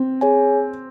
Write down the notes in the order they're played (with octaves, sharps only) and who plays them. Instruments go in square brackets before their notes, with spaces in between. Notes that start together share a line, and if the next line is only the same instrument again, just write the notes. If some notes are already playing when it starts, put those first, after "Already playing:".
Already playing: [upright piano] C4
[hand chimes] G#4 C#5 G#5